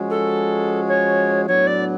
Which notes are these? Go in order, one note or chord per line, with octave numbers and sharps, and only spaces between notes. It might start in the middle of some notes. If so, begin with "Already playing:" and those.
Already playing: F3 G#3 C#4 F#4
A4
C#5
A2 F#3 B3 D4 C#5
D5